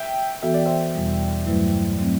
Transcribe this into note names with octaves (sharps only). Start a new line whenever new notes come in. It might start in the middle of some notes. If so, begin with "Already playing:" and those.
Already playing: E5 G5
E3 B3 F#4 A4 E5
D5
C5 E5
E2 B2 G3
G2 F#3 A3 E4 B4
F#3 A3 C4